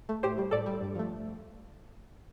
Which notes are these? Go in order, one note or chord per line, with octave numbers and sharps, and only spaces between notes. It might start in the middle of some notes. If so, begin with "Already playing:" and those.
A3
A2 G4 C5
G3
A2 A4 D5
G3
G2
F3 A3